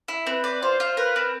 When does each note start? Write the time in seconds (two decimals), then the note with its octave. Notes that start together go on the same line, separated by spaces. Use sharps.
0.08 E4
0.27 C4 B4
0.44 D5
0.63 F4 C5
0.80 F4
0.97 A#4 B4
1.16 C4